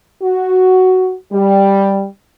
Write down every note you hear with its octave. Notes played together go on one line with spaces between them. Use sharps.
F#4
G3